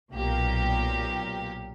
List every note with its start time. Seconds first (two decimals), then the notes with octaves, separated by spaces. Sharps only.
0.12 B1 A#2 A#3 G4